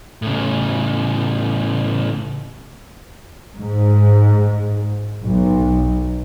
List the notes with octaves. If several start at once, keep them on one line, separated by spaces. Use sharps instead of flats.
A2 C#3
G#2
B1